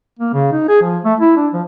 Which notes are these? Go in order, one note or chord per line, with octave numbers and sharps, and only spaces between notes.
A#3
C#3
D#4
G#4
F3
A3
E4
D4
F3